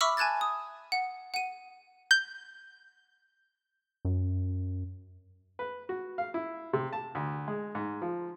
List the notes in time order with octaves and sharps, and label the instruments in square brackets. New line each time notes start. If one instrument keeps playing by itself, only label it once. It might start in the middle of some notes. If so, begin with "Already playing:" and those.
[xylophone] E5 B5 C#6 D6 E6 F6
G#5 A5 F#6 G#6 A6
D#6
F#5
F#5 D#7
[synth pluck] G6
[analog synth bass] F#2
[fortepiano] B4
F#4
F5
E4
C3
A5
D2
G#3
G#2
F3